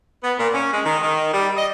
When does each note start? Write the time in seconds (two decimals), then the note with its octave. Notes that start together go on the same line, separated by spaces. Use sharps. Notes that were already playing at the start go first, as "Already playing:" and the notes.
0.24 B3
0.38 A#2
0.54 C#4
0.73 G#3
0.85 D#3
1.02 D#3
1.34 G3
1.57 D#5